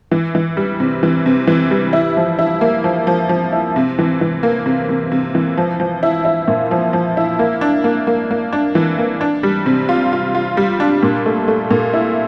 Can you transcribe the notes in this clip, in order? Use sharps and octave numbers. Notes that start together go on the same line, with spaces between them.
E3
E3
G3
C3
E3
C3
E3
G3
E4
F3
E4
A#3
F3
F3
F3
E4
C3
E3
E3
A#3
C3
C3
C3
E3
F3
F3
E4
E4
A#2
F3
F3
E4
A#3
D4
A#3
A#3
A#3
D4
E3
A#3
D4
G3
C3
F4
F4
F4
G3
D4
A#2
A3
A3
A#2
E4